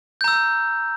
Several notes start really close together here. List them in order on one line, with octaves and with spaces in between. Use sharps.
G6 A#5 E6